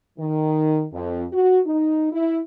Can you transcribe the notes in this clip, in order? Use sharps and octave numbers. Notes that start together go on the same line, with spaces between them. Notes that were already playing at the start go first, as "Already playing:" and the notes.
D#3
F2
F#4
D#4
E4